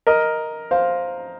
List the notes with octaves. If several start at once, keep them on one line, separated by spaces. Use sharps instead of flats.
A#4 D#5
C5 F5